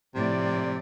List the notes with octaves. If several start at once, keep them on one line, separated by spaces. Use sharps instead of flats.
A2 C3 F3 D5